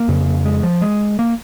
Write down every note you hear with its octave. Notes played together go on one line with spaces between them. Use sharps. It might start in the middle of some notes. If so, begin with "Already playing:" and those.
Already playing: A#3
F2 C#3
G#3
F3
G#3
A#3